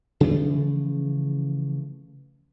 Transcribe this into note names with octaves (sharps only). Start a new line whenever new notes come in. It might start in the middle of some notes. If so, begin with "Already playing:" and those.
C#3 E3 F3 A3